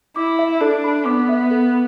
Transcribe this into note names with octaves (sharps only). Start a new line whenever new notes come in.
E4 D6
E5
D4 A4
B5
B3 D6
E5
A4